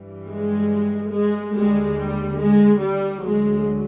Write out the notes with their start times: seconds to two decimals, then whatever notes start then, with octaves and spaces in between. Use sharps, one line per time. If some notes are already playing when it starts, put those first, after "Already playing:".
Already playing: G2 E3 G3
0.27 G#3
1.11 G#3
1.54 D#2 D3 G3 G#3
1.96 G3
2.38 G#3
2.80 G3
3.22 D2 D3 F#3 G#3